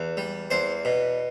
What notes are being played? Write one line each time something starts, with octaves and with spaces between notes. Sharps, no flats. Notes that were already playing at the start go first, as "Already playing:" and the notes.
Already playing: E2
G3
E2 C5
B2